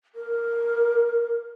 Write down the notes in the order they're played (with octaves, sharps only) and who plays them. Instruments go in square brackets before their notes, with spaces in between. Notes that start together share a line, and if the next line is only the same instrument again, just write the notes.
[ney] A#4